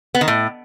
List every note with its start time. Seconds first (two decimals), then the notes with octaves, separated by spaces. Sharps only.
0.15 B3
0.21 D#3
0.28 A2